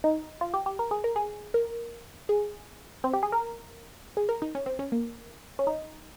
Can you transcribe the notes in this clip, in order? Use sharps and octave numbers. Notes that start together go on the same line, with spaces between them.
D#4
F4
G4
G4
A#4
G#4
A#4
G#4
A#4
G#4
C4
G4
G#4
A#4
G#4
A#4
D#4
C#4
C4
C#4
A#3
C#4
D#4